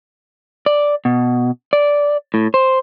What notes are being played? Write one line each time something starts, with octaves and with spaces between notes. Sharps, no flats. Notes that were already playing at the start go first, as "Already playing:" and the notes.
D5
B2
D5
A2
C5